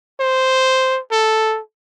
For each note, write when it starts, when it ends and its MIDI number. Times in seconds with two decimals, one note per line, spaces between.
0.20 1.00 72
1.11 1.60 69